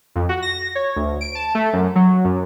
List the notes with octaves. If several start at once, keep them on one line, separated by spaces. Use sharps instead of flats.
F2
F#4
A#6
C#5
D2
D7
A5
A3
F#2
F#3
F#2